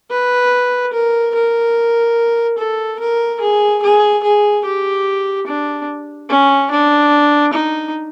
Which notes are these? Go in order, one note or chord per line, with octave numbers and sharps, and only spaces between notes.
B4
A#4
A#4
A4
A#4
G#4
G#4
G#4
G4
D4
C#4
D4
D#4